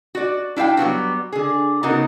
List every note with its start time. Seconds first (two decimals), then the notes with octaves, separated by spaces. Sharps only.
0.15 F#4 D5
0.56 D4 E4 E5 F5 G5
0.77 F#3 G3 B3 F#4
1.32 D3 G#4
1.83 C#3 B3 D#4 F#4 A#4